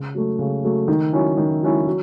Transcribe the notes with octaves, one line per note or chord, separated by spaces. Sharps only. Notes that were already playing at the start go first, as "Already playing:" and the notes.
Already playing: C#3
F#3 A3
C#3
F#3 A3
D#3
F#3 C#4 E4
D#3
F#3 C#4 E4
F#3